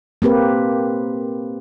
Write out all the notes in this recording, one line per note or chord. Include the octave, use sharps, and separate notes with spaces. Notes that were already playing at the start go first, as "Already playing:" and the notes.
A#3 C4 G4 B4